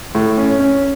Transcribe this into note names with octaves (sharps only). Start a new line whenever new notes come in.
A2
C#4
C#4